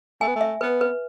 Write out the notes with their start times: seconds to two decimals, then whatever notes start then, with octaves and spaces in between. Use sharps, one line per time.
0.21 A3 G#5
0.28 B3
0.36 A3
0.41 E5
0.61 B3 B4
0.81 B4